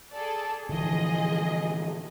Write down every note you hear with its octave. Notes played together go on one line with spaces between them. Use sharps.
G#4 A4 D5
A#2 D3 E3 F3 G#4 D#5